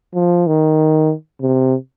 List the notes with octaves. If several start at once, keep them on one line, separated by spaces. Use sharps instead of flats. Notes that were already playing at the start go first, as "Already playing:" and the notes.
F3
D#3
C3